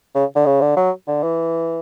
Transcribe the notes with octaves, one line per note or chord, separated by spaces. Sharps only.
C#3
D3
C#3
D3
F#3
D3
E3